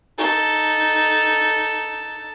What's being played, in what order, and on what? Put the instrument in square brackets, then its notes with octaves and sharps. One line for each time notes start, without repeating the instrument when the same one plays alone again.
[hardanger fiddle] D#4 A4